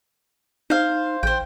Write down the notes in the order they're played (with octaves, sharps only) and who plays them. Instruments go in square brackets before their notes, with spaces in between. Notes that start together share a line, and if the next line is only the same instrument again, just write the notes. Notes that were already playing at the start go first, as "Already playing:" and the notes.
[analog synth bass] D#4 [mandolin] C5 F5
[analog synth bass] A#1 [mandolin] C5 G5